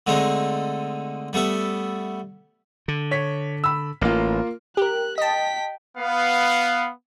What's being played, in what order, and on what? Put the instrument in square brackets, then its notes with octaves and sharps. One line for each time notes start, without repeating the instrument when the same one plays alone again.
[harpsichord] D3 G#3 A3 C4 D#4
G3 A3 B3 E5
[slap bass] D3
[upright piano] C#5 B6
B5 E6
[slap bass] A1 [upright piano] A#3 F4
[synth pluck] G4 A#4 [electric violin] F#6
[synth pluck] D#5 A5 [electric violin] G5 B6
[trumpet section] B3 F5